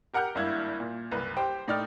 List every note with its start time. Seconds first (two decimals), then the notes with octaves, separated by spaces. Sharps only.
0.14 G4 A#4 F#5 A#5 F6 G6
0.35 G#1 G2 A#3 E4 G#6
0.80 A#2
1.11 F#1 C2 B4
1.37 G4 C5 G5
1.68 A2 D#4 D5 G5 F6